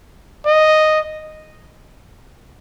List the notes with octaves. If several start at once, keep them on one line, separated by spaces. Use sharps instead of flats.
D#5